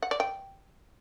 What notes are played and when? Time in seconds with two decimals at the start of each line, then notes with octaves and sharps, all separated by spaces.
0.02 F#5
0.11 D5
0.20 G5